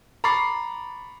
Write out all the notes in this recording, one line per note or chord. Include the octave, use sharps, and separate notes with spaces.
A#5 B5 C#6 D6 A6 C7